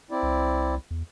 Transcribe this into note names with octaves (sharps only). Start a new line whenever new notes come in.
C4 E4 D5
C2
E2